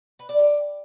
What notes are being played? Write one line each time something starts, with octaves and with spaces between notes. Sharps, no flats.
B4
D5
G4